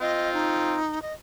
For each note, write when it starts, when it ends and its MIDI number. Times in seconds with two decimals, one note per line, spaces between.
0.01 0.75 60
0.01 0.75 65
0.01 0.33 75
0.34 1.02 63
1.02 1.13 75